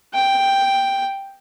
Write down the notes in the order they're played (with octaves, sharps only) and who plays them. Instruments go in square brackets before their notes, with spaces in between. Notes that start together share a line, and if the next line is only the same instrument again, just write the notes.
[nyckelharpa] G5